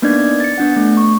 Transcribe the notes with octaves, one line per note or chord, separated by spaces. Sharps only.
A#3 B3 D4 D#4 D5 G#6
A6 C#7
B3 D4 F#5
A3
C#6